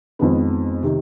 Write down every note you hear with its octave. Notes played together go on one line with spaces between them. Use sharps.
F2 D#3 G#3 B3
C3 D#3